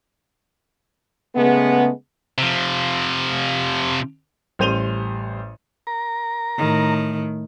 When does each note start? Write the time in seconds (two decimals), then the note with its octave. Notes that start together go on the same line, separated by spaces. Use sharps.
1.35 C#3 G#3 A3 B3
2.38 C3 F3
4.59 A1 G3 C5 D#7 F7 G7
5.87 A#4 A#5
6.57 A2 D#3